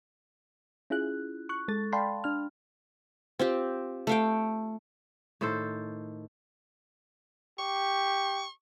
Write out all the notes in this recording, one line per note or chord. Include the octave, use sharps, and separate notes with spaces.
C#4 E4 F4 G#4 F#6
C#6 F#6
G#3 A4 A6
D5 F5 G5 A5 B5 C6
D4 F6
C4 F4 G4
A3 F5 G5
A2 D#3 A4 C5
G4 C#6